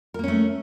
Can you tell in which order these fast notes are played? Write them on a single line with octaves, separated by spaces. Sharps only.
A#4 A#3 C#4 A3